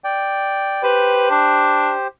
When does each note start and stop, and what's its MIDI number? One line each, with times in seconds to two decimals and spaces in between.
0.04 0.83 74
0.04 0.83 79
0.83 2.07 67
0.83 1.27 71
0.83 2.07 72
1.31 1.91 62